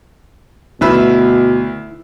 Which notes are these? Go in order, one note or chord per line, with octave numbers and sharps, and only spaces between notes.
D2 B2 E4 B4 E6